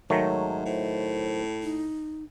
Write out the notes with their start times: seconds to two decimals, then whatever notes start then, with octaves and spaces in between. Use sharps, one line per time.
0.10 G#2 D#3 F#3 A3 C#5
0.65 A2 C5
1.63 D#4